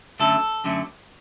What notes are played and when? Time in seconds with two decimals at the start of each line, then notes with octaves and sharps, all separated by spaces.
0.19 F#2 D3 F#3 A3 A4
0.64 F#2 D3 F#3 A3